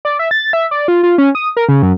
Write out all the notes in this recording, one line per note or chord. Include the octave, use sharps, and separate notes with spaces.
D5
E5
A6
E5
D5
F4
F4
C#4
D#6
A#4
C#3
F#2